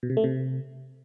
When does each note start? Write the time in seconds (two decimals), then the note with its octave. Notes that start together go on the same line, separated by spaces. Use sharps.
0.03 B2
0.10 C3
0.17 A3
0.24 C3